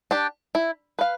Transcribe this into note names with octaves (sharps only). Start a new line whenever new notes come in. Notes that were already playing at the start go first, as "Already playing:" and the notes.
D4 G4
E4
B4 F5